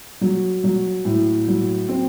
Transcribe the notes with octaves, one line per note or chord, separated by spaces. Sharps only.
F#3
F#3
A2
F#3
C4